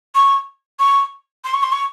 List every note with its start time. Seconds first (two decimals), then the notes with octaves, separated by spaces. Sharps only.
0.15 C#6
0.79 C#6
1.44 C6
1.54 C#6
1.63 C6
1.72 C#6